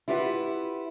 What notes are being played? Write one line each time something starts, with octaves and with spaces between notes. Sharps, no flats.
E4 F4 G4 B4 D5 F#5